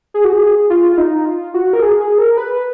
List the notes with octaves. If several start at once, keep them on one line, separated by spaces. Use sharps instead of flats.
G#4
F#4
G#4
F4
F4
D#4
F4
F#4
A#4
G#4
G#4
A#4
B4